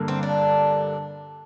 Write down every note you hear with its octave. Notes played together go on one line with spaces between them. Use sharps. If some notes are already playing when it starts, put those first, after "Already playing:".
Already playing: G2 D3 A#3
C4
D4